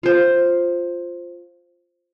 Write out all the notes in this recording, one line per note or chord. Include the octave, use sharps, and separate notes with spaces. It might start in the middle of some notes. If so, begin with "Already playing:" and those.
F4 C5